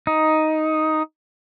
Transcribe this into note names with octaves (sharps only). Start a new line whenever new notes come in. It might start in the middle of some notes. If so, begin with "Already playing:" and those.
D#4